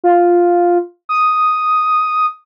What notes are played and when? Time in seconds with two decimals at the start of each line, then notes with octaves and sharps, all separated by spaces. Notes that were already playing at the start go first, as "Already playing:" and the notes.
0.04 F4
1.09 D#6